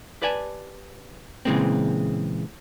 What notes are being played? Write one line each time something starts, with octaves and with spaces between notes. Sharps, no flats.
G4 B4 D5 D#5 G#5 A5
A#2 C#3 E3 G#3 A#3 C4